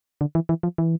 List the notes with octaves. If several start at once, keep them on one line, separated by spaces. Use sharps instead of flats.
D3
E3
E3
F3
E3